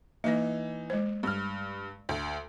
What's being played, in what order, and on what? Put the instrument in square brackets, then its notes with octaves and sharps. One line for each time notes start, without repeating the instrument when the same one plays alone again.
[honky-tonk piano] E3 D#4 [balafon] A#3 D#5
[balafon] G#3 C5
[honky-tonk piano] G2 F6
D2